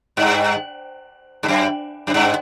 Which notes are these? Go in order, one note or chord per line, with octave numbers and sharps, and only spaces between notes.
G2
G2
F#2
F#2
G2